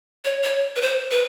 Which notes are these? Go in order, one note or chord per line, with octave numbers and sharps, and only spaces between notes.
C#5
C#5
B4
C5
B4